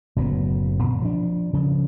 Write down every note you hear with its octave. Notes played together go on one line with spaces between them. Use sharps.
F#1 A2 F#3 B3
A#2
F3 D4
C#3 F3